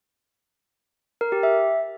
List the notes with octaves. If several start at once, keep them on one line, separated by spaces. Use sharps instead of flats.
A#4
G4
E5